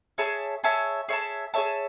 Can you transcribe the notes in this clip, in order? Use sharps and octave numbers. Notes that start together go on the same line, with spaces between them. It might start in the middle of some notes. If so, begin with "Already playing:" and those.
G#4 C#5 E5 A5
G#4 C#5 E5 A5
G#4 C#5 E5 A5
G#4 C#5 E5 A5